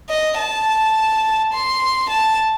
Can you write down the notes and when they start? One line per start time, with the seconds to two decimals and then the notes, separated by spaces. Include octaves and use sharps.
0.09 D#5
0.38 A5
1.54 C6
2.10 A5